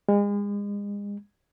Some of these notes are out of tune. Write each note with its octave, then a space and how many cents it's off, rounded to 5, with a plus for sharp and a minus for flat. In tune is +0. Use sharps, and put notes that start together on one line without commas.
G#3 -35